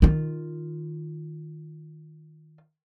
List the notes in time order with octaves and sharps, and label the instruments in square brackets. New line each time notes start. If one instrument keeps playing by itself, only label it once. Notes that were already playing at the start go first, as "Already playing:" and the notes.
[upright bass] D#3 F4